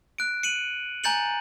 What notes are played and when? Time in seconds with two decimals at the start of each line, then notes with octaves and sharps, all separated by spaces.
0.18 F#6 D7
0.43 C#7 D#7 F#7
1.04 G#5 A#5 G6 A6 C#7 F#7